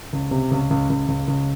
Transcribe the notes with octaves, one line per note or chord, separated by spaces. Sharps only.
C#2
C3
C#2
C#2
C#2
C#2
C#2